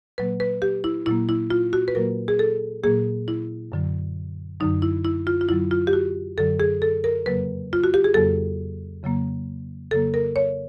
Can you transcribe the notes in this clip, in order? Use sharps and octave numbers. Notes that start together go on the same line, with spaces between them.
A#2 F#3 A#3 B4
B4
G4
E4
A#2 F#3 A#3 E4
E4
F4
F#4
B4
A#2 F#3 A#3 A#4
G#4
A4
A#2 F#3 A#3 G#4
E4
F#2 D3 F#3
F#2 D3 F#3 D#4
E4
E4
F4
F4
F#2 D3 F#3 E4
F4
G4
F#4
F#2 D3 F#3 A4
G#4
A4
A#4
F2 C#3 F#3 A#3 B4
F4
F#4
G4
G#4
F2 C#3 F#3 A#3 A4
F2 C#3 F#3 A#3
F2 C#3 F#3 A#3 A4
A#4
C#5